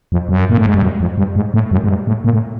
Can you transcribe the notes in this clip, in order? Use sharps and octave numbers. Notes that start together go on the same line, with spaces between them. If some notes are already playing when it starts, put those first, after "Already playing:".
F2
F#2
A#2
A2
G#2
G2
F#2
F2
G2
G#2
A2
F#2
G#2
G2
A2
A#2
A2